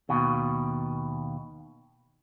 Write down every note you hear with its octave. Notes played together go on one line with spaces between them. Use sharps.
D#2 B2